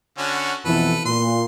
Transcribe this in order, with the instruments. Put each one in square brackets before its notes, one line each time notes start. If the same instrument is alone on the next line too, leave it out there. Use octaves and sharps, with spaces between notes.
[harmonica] D3 C#4 F#4
[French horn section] F2 B2 E3 [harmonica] A4 B4
[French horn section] A#2 [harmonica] C6